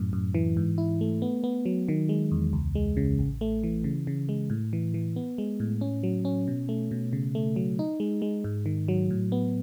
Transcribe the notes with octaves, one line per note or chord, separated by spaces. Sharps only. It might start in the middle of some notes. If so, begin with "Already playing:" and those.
Already playing: F#2 A2
F#2
E3
G#2
E4
A3
B3
B3
F#3
D#3
G#3
E2
C#2
G#3
C#3
A1
A3
E3
C#3
C#3
G#3
A2
E3
E3
B3
G#3
A2
C#4
F#3
C#4
B2
A3
B2
C#3
A3
F#3
D#4
G#3
G#3
G#2
D#3
F#3
A2
B3